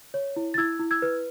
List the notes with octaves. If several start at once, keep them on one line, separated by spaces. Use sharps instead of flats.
C#5
E4
A6
E4 E6 G#6
E4
E6 G#6
B4